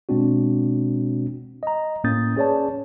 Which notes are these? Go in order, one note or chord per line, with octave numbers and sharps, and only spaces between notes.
B2 G#3 C4 D4 F#4
D#5 A#5
A2 A#3 C#4 D#6 G6 A6
C#4 G#4 B4 C#5 D5 A5